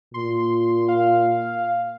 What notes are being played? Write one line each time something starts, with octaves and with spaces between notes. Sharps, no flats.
A#2 C6
F5